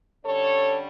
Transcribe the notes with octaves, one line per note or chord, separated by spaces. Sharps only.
D3 G3 C#4 A4 C#5